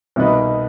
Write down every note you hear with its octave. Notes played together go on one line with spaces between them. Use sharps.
C2 B2 B3 D#4 B4